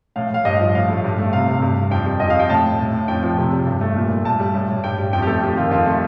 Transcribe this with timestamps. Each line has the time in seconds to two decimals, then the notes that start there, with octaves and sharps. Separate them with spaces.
0.16 A2 F5
0.30 A2 F5
0.45 G2 D#5
0.60 F3
0.74 A2 F5
0.89 A3
1.04 G2
1.18 A3
1.32 C3 F5
1.48 C3
1.62 G2
1.77 G3
1.91 F2 G5
2.05 G3
2.20 F2 D#5
2.30 F5
2.35 G3 G5
2.49 A2 A5
2.64 A2
2.79 A2
2.93 A2
3.08 F2 G5
3.23 F3
3.37 C3
3.52 G3
3.66 G2
3.81 A3
3.96 A#2
4.11 A3
4.25 G2 A5
4.40 G3
4.54 A2
4.69 A2
4.83 G2 G5
4.98 G3
5.13 F2 G5
5.22 G4
5.27 A3 A4
5.42 F2 G4
5.57 D#3 F4
5.71 F2 F4
5.86 A3